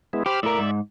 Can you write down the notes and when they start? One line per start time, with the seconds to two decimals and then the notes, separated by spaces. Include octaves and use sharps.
0.13 G#3 B3 E4
0.26 G4 C5 B5 F6
0.43 A2 A#4 D5 E5
0.59 G#2